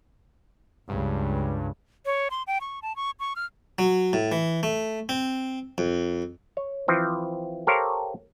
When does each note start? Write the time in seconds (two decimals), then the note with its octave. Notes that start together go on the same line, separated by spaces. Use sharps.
0.89 C#2 G2
2.06 C#5
2.31 C6
2.47 G5
2.61 C#6
2.82 A5
2.96 C#6
3.20 C#6
3.36 F6
3.79 F#3
4.13 A2
4.32 E3
4.63 A3
5.09 C4
5.78 F2
6.57 C#5
6.88 E3 F3 C4
7.67 G4 A4 A#4 C5 C#5 F5